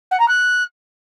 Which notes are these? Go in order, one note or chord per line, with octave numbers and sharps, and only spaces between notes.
F#5
A#5
F#6